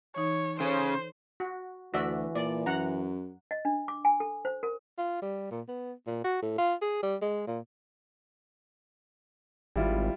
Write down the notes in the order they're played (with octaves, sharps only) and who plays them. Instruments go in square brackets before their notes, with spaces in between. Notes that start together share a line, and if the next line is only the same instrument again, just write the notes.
[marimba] E3 D#4 [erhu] C#5
[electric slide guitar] C#3 C#4 [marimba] A4 C#5 [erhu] C5
[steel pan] F#4
[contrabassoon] D2 [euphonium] E3 [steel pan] F#4 D5 E5
[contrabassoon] A#2 [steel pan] D5
[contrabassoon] F#2 [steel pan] F#5 A#5
[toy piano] D#5
D4
D6
G#5
A4
C5
A#4
[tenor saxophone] F4
G3
A#2
B3
A#2
F#4
A2
F4
G#4
G3
G#3
A#2
[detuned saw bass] G#1 [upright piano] G3 E4 F4